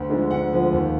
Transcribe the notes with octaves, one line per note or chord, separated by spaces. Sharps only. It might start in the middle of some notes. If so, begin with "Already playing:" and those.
Already playing: D2 F#5
D3 F3 G#3
D2 F#5
D3 F3 G#3
D#2